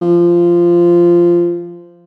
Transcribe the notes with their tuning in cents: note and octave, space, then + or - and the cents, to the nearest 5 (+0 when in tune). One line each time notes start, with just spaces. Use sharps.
F3 -15